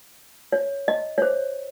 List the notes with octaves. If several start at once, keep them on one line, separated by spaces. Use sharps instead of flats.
C#5
D#5
C#5
C5